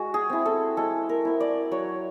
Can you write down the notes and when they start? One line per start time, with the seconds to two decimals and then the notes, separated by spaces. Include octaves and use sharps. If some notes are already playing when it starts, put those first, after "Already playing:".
Already playing: G#3 F#4
0.14 G#4
0.30 C4 E4
0.45 A4
0.77 G#3 A4
1.09 A#4
1.25 C4 E4
1.40 D5
1.71 F#3 C#5